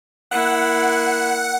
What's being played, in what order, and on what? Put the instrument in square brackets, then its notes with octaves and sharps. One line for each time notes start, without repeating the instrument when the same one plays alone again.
[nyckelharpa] A#3 E4 [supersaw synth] F#5